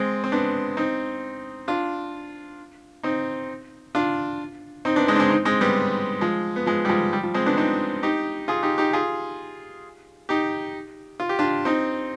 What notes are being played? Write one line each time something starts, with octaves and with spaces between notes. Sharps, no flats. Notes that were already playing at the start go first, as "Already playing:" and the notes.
Already playing: G#3 C4
C4
B3 D4
C4 D#4
D4 F4
C4 D#4
D4 F4
C4 D#4
B3 D4
G#3 C4
D4
G#3 C4
C4 D#4
G#3 C4
G3 B3
F3 G#3
B3
F3 G#3
G3
F3 G#3
G3
F3
G#3 C4
B3 D4
C4 D#4
D#4 G4
F4 G#4
D#4 G4
D#4 G4
F4 G#4
D#4 G4
F4
G4
D4 F4
C4 D#4